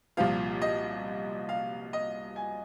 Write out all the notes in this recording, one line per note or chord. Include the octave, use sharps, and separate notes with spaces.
C2 A#2 F3 F5
D#5
F5
D#5
G#5